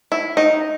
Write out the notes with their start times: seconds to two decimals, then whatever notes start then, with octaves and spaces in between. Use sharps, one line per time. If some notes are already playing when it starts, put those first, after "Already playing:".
0.12 E4
0.37 D#4